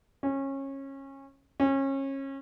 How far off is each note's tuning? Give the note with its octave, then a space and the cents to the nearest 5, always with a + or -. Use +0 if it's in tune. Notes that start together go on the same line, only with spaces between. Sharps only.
C#4 -25
C#4 -30